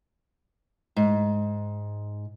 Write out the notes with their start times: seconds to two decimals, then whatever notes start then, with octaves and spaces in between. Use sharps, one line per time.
0.96 G#2